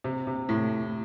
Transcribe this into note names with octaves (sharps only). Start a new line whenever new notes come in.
C3
C3
A2